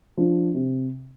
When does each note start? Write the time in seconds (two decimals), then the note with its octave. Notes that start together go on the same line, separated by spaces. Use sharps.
0.17 F3 D4
0.54 C3